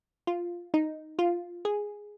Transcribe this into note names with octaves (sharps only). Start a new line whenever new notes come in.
F4
D#4
F4
G#4